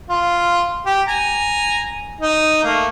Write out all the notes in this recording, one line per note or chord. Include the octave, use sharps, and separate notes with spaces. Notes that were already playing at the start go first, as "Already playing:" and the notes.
F4
G4
G#5 A#5
D#4
A3 A#3